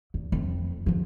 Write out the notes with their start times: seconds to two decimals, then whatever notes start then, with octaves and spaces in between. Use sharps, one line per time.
0.14 E2
0.32 F2
0.86 D3 F3